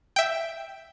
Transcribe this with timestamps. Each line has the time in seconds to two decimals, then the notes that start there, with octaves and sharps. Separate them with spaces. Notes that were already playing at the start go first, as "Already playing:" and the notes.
0.16 E5 G5